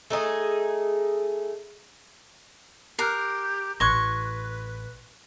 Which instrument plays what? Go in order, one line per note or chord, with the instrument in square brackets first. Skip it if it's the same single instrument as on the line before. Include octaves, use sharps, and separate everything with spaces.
[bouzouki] A3 D#4 G#4
[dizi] G4 [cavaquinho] A#4 [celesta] F6 F#6 C7
[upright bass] A1 [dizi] B4 [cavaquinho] C6 C#6 [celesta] F#6 G#6 A#6